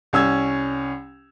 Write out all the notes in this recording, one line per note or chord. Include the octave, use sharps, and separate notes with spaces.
C2 C#4 E6 G#6